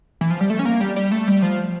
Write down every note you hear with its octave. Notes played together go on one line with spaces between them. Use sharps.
E3
F3
G3
A3
C#4
A#3
G3
G3
A3
G3
F3